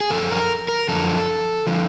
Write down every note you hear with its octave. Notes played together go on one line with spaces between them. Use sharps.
G#4
F#2 D3 F3 A4
A#4
A#4
F#2 D3 F3 A4
D3 F3